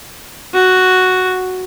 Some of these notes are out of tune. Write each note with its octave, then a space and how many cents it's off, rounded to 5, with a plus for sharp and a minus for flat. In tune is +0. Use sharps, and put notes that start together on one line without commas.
F#4 +0